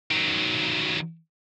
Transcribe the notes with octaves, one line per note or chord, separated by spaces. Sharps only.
D#3 F#3